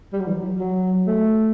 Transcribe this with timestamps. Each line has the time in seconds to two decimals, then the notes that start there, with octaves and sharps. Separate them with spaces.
0.13 G3
0.21 F#3
0.28 E3
0.35 F#3
0.60 F#3
1.07 A3